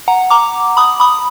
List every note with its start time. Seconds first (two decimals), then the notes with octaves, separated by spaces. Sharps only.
0.08 F#5 A#5
0.30 A#5 D6
0.77 B5 D#6
1.00 B5 D#6